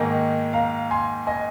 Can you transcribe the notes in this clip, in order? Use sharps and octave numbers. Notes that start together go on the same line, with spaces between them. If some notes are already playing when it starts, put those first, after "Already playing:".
Already playing: G#2 D#3 A#3 D#4 G#5
F5 A#5
G#5 C6
D#5 G#5